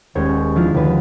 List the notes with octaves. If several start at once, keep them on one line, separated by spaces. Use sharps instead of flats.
D#1 D#2 G#3 C#5 G6 G#6
F3 D4 E4 F4
D#2 D3 D4 B4